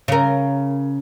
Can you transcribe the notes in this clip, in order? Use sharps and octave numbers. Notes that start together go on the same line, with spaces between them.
C#3 A#4